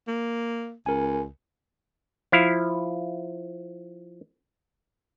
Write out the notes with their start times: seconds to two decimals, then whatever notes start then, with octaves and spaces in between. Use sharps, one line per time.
0.08 A#3
0.86 C#2 A#4 G#5
2.32 F3 E4 F5